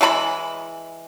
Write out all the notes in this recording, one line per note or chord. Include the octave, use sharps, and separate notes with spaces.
E3 G#3 A5 B5